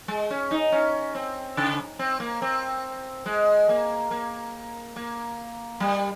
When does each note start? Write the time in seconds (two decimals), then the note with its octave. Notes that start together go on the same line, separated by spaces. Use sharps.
0.08 G#3
0.31 C#4
0.51 D#4
0.72 C#4
1.15 C4
1.57 C#3
1.99 C4
2.20 A#3
2.42 C4
3.26 G#3
3.69 A#3
4.11 A#3
4.96 A#3
5.80 G3